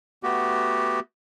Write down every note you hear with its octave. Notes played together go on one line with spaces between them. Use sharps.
A3 B3 F#4 G4